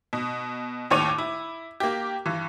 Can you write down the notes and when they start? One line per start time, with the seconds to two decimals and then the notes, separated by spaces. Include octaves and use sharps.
0.13 B2
0.90 D#2 A2 C#5 D6 D#7 F7
1.18 E4
1.80 A#3 G4
2.26 G2 E3